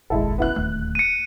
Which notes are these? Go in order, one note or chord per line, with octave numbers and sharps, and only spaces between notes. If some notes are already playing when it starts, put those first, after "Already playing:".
F1 A#1 D#2 G#3 E4 A4
B3 E4 F#6
D1 D#2 A3 F#6
C#7 D#7